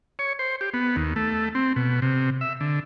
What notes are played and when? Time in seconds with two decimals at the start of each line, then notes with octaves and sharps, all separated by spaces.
0.19 C#5
0.39 C5
0.61 G4
0.74 B3
0.96 D#2
1.16 A3
1.55 C4
1.76 B2
2.02 C3
2.41 E5
2.61 D3